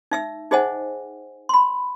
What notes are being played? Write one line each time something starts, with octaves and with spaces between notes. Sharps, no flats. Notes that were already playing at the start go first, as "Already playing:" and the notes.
D#4 E5 E6
D#4 G#4 C5 D#5 F#5 G#5
B5 C6